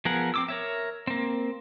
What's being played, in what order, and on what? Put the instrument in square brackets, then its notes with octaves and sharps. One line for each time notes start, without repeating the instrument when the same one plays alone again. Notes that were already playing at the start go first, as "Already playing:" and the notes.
[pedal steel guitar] F3 B3 G#4 A#4 F#5
C4 D6 E6
A#4 C#5 E5
A#3 C4